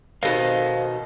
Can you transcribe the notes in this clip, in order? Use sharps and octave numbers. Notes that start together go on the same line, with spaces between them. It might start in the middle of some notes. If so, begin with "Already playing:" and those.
B2 D#3 A4 C5 F5